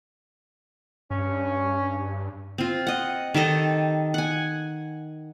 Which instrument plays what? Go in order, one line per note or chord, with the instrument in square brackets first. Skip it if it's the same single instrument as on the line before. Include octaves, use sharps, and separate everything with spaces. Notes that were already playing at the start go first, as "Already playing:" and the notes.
[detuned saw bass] G2 [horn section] C#4
[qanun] C4 F4
D#5 F#5
D#3 G4 A4 D#5
F#5 G#5